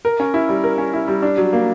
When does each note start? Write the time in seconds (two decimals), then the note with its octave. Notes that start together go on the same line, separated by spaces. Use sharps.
0.05 A#4
0.20 C#4
0.34 E4
0.49 G3
0.64 A#4
0.78 C#4
0.93 E4
1.08 G3
1.23 D4
1.38 F#3
1.53 A#3